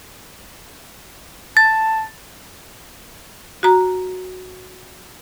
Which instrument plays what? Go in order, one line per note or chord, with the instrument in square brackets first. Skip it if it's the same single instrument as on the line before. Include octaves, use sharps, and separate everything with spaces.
[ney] A5 [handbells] A6
[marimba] F#4 A#5